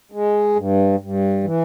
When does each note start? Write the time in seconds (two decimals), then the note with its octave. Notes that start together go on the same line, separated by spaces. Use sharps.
0.12 G#3
0.56 G2
1.00 G2
1.44 E3